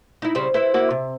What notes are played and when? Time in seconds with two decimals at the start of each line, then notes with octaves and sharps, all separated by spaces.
0.22 D#4 E4
0.35 C#3 G3 C4
0.54 E4 B4 C5
0.74 A#3 E4 F#4
0.91 C3